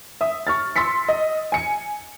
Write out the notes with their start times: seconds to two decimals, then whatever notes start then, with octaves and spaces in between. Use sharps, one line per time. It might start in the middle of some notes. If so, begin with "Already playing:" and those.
0.21 E5 D#6
0.47 C#6 F6 A6
0.76 C6 E6 A6 B6 C#7
1.09 D#5
1.52 G#5 C#7